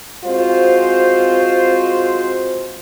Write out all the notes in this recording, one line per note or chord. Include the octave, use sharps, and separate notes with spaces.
G#3 C4 F4 F#4 C5